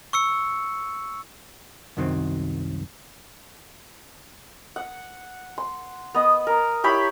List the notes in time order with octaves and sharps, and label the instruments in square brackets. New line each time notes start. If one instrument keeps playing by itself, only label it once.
[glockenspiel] C#6 E6 C#7
[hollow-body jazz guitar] C2 F#2 D#3 F#3 C4
[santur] F#5
C6
B3 D#5
A#4
E4 G4 C#5 B5